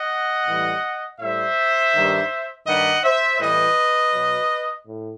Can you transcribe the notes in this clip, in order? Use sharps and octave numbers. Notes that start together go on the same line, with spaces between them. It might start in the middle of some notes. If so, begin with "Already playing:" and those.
Already playing: D#5 F#5
A2 E3 G3
A2 G3 C5 E5
G2 D#3 G3
G2 D#3 G3 D#5 F#5
C5 E5
A2 E3 G3 B4 D#5
B2 F#3
A2